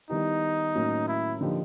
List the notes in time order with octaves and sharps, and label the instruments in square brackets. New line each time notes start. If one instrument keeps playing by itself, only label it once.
[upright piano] D#3 G3 B3 E4 G4 [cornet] D#4
[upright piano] A2 F#3 A#3 C#4
[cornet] E4
[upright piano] D3 F3 A#3 D#4 G4